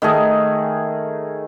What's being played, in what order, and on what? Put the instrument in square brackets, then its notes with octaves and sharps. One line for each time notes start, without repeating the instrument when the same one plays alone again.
[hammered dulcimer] D#3 A3 G#4